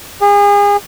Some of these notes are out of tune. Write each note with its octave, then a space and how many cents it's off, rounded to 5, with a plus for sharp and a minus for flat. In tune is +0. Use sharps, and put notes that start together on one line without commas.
G#4 -35